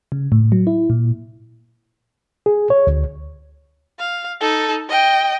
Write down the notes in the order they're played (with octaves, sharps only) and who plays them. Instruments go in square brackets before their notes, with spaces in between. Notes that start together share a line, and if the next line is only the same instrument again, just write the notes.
[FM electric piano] C#3
A2
F#3
E4
A#2
[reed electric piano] G#4
C#5
D2
[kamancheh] F5
D#4 A4
D#5 G5